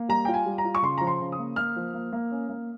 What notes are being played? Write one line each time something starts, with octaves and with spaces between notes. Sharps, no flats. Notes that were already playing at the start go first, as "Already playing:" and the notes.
Already playing: A#3
G3 A#5
F4 G5
G#5
G3
A#5
F4
C#6
C#3 C6
F3 A#5
C6
C#3
D#6
A#3
A#3 F6
F3
A#3
A#3
C#4
A#3